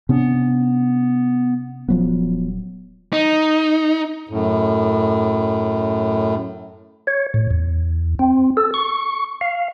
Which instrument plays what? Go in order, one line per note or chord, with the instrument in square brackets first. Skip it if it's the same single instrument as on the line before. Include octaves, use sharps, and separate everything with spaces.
[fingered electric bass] C3 C#4 D4 [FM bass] B3
[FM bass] D#1 [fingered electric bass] F3 F#3 B3
[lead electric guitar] D#4
[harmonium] F#2 A2
[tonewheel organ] C#5
A2
E2
C4
A4
C#6
F5